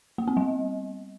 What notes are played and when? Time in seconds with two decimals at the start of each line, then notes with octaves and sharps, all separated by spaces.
0.18 A#3
0.28 C4
0.37 G3